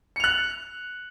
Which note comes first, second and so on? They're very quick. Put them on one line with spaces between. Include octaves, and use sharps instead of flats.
C#7 F7 F#6